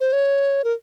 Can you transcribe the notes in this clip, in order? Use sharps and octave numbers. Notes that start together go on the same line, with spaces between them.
C5
C#5
A#4